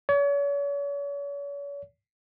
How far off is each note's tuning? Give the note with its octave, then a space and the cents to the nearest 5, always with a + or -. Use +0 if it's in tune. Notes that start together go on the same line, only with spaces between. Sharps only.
C#5 +40